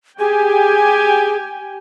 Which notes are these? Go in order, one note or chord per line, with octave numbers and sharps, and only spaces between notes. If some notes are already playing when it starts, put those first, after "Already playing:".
G4 G#4 G5 G#5